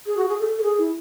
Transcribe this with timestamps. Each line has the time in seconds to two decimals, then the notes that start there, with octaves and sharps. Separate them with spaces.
0.06 G#4
0.17 F#4
0.29 G#4
0.40 A4
0.58 A4
0.63 G#4
0.78 E4